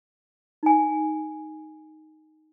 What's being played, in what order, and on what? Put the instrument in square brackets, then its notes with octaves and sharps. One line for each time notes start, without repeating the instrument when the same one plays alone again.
[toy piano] D#4 G#5